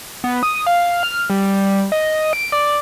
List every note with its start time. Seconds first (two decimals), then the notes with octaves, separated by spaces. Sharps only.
0.24 B3
0.43 D#6
0.66 F5
1.03 F6
1.30 G3
1.92 D#5
2.33 D7
2.52 D5